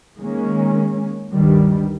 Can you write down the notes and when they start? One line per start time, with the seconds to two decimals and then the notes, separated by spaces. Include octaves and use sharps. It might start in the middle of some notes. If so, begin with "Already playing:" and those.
0.19 D#3 G#3 A#3 C#4
1.33 D2 G2 D#3 G3